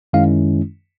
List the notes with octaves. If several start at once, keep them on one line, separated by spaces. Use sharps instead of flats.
F#2 D#3 G#3 C#4 E4 F5